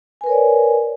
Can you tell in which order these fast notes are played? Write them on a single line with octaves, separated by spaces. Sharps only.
G#5 B4 A#4 C#5 D5